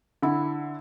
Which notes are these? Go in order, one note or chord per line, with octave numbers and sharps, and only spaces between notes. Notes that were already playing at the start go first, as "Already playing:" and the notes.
D3 E4